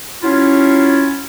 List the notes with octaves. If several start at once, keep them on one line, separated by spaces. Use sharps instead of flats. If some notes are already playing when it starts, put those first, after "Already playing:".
F#3 C#4 E4 F4